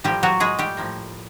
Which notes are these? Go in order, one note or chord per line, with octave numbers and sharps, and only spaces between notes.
A2 F3 G3 A#3 G4
F#3 F#4
G#3 G#4
G3 G4
A2 F3 A#3